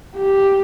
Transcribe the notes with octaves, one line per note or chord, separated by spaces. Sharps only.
G4